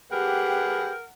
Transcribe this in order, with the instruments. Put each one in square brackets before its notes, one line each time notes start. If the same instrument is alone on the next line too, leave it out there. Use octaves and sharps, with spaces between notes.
[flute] G4 [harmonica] G#4 B4 G5 [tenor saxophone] A#4 [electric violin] F#5